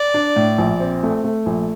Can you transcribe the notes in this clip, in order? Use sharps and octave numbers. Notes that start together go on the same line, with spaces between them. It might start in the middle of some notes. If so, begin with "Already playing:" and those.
Already playing: D5
D4
A2
A#1
C4
A3
A3
A#1